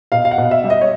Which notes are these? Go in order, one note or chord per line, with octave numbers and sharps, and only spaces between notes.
B2 F5
F5
F#5
B2
E5
G3
D#5
C#5